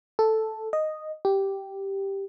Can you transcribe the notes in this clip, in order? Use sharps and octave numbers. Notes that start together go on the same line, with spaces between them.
A4
D#5
G4